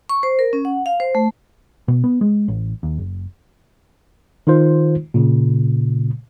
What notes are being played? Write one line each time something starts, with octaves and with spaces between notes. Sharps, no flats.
C#6
C5
A#4
C#4
F#5
F5
C5
A3
B2
B3
G#3
A1
D#2
F#1
D#3 D#4 F4 C5
A#2 C#3